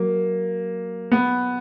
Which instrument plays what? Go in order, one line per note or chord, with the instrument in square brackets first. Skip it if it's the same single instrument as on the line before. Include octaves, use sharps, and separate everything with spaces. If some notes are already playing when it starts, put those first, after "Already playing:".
Already playing: [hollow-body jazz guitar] F#3 [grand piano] A#3
[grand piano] B3